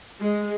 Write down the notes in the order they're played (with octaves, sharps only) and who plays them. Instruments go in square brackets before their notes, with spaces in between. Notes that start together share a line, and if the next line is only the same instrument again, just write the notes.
[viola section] G#3